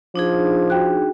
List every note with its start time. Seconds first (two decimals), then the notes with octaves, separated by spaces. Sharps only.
0.16 F3 D4 D#4 G#4
0.70 F#4 G5 F#6